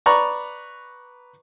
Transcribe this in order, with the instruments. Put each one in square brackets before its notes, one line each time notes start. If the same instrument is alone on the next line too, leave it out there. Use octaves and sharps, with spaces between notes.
[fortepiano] B4 D5 A#5 B5 C#6